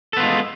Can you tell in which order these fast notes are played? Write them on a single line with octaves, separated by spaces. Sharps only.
A4 B3 F4 G#3